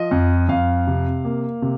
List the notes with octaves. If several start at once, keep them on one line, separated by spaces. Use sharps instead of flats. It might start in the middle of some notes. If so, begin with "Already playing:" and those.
Already playing: F3 D#5
F2
F2 F5
C3
A#3
C3